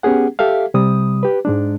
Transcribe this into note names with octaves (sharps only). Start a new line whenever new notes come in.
B3 C#4 G4 G#4 F#5
G4 A4 E5 F5
C3 G3 D#6
G4 B4
G#2 G#3 D4